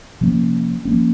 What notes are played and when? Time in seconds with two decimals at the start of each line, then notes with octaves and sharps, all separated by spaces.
0.21 C3 F3 A#3 C#4
0.85 F3 A#3 C#4